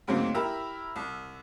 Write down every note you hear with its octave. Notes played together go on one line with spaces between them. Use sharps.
D2 G#2 F#3 A#3 C4 C5
E4 G4 A#4 A#5 B5 E6
C2